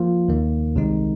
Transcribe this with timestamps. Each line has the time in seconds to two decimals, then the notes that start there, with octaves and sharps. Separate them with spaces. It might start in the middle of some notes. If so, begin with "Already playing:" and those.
Already playing: F3 A#3 F4
0.28 D#2 D#3 A#3
0.76 C2 C3 D#3 G#3 D#4